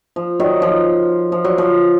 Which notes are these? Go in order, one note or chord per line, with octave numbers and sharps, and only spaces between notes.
F3
D#3 F#3
F3
F3
F#3
F3